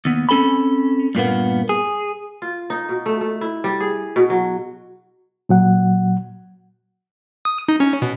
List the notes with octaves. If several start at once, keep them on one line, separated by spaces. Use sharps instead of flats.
D#2 B3
C4 C#4 A4 G#5 B5
G2 A#2 A#3 B3
G#4
F4
D#4
B2
A3
A3
E4
G3
G#4
B2
F#3
A#2 F#3 F#5
D#6
D#4
C#4
B2